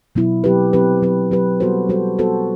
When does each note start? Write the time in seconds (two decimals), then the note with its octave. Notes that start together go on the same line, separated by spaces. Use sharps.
0.15 B2 F#3 B3 E4
0.44 F#3 C4 G4 B4
0.73 F#3 C4 G4 B4
1.02 F#3 C4 G4 B4
1.31 F#3 C4 G4 B4
1.60 G3 B3 F#4 A4 C5
1.89 G3 B3 F#4 A4 C5
2.18 G3 B3 F#4 A4 C5